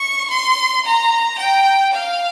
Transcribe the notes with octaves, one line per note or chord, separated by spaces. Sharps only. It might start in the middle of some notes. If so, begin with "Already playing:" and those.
Already playing: C#6
C6
A#5
G5
F5